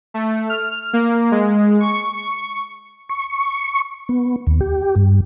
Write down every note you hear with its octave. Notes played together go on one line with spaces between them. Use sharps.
A3
F6
A#3
G#3
C#6
C#6
B3
D#2
G4
G2